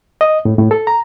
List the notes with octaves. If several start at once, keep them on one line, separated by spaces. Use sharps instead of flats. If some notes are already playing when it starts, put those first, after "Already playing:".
D#5
A2
A2
A4
A#5